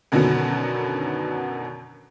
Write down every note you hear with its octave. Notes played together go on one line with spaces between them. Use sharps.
F#2 B2 D3 D#3 F#3 B3